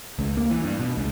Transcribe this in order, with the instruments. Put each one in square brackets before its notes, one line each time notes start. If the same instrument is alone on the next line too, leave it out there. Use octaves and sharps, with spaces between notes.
[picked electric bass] C#2
A#3
E3
G2
B2
C#2